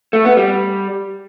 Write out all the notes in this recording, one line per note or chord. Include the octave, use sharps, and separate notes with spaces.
A3
B3
G3